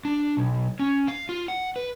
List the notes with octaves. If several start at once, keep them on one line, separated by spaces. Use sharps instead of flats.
D4
B1
C#4
F5
F4
F#5
B4